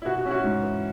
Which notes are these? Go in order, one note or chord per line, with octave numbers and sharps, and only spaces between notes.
E4
B2 F#4
F#4
C#4 E4
F#4
G#2
E3